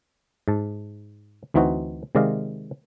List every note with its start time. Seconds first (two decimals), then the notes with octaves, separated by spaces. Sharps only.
0.48 G#2 A5
1.54 D2 E3 C4 D#4 F#4
2.15 C3 D#3 G#3 D5 D#5 F5